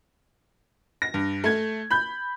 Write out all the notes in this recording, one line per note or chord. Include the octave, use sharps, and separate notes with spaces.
A#6
G2
A3 G#6
B5 G6